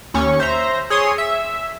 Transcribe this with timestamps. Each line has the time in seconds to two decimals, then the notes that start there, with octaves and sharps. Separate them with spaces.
0.14 D#2 C#4 C#6
0.40 C5 E5 A#5
0.90 G#4 C#5 C6 D#6
1.18 E5